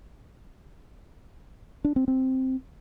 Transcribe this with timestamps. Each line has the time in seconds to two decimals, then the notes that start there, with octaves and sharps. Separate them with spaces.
1.84 D4
1.96 C4
2.08 C4